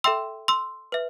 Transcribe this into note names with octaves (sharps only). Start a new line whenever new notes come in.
A4 E5 G5 C6 E6
C6 E6
B4 E5